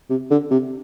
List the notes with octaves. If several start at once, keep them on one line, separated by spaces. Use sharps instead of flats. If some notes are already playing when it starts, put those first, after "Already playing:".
C3
D3
C3